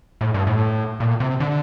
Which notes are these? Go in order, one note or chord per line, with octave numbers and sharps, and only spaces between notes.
A2
G2
A2
A#2
C3
D3